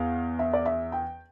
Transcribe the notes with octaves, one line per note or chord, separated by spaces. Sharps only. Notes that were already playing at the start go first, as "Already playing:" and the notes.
Already playing: E2 F5
E5
D5
E5
G5